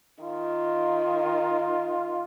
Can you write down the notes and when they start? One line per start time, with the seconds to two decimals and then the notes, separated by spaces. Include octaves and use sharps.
0.23 D#3 F4